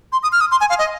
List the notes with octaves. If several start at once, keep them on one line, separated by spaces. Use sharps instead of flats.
C6
D#6
F6
D#6
C6
G#5
F5
D#5